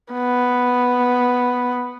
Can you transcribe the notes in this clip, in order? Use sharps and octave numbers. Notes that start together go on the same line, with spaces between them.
B3